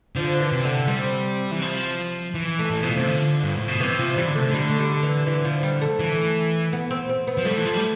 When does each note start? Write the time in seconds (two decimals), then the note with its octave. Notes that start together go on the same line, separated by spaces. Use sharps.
0.16 D3 F3
0.40 E3
0.52 C3
0.65 D3
0.88 C3 G3
1.51 E3
1.62 F3
2.34 E3
2.59 A3
2.70 A2
2.83 B2 F3
2.95 C3
3.07 D3
3.43 G2
3.55 A2
3.68 B2
3.80 C3 E3
3.99 F3
4.17 E3 G3
4.28 D3
4.35 C3 A3
4.48 D3
4.54 G3
4.69 A3
4.79 G3
5.03 E3
5.26 E3
5.45 F3
5.63 G3
5.82 A3
5.99 E3
6.73 B3
6.90 C4
7.09 C4
7.27 B3
7.37 F3
7.45 G3 A3
7.57 E3
7.65 F3
7.74 G3